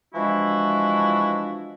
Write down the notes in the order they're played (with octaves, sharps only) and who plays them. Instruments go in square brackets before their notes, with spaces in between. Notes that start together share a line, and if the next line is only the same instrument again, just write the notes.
[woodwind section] E3 F3 G#3 D4 E4 F#4